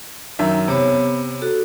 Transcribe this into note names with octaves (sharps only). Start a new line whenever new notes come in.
F#2 D#3 E5
C3 B3 C#5 B5
F#4 A4